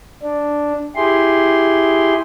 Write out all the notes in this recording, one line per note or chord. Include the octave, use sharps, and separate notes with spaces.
D4
E4 G4 G#4 C6